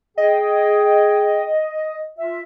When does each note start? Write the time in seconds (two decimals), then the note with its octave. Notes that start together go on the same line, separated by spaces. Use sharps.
0.17 G#4 D#5 G5
2.18 F4 E5